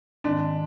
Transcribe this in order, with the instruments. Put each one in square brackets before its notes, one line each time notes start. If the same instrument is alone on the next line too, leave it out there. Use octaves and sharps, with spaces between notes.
[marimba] G#2 D#3 G#3 C4 [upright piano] D4